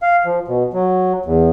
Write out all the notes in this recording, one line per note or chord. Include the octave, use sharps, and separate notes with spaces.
F5
F3
B2
F#3
E2